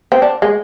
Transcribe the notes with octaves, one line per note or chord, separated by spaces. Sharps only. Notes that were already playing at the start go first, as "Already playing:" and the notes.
C4
D4
G#3